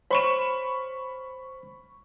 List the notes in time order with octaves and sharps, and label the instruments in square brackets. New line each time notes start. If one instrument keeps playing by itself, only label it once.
[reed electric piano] C5 C#5 [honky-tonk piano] B5 C#6 E7